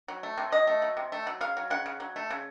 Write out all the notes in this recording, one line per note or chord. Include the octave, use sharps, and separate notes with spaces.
F#3
A3
C3
F#3 D#5
A3
F#3
C3
A3
F#3
C#3 F5
F#3
C#3 F#5
C#3
F#3
A3
C#3